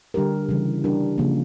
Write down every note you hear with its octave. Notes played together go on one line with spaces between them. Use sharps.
D3 G3 D4 G4 A#4
C#3 E3 G3
G3 D4 G4 A#4
C#3 F3 A#3